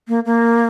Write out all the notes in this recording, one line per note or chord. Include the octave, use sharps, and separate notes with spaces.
A#3
A#3